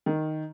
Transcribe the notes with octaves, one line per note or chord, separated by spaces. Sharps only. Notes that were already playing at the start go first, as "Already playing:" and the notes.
D#3